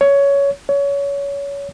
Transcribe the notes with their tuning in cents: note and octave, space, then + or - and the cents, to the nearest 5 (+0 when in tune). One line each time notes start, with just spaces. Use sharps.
C#5 +15
C#5 +25